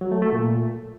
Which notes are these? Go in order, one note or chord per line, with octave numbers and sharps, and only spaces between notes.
F#3
A3
A3
A#2